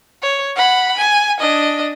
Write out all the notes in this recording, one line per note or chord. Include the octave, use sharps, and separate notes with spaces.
C#5
F#5 B5
G#5
D4 D#5